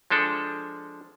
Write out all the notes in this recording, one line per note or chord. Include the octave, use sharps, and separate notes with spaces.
F3 G#3 D4 A4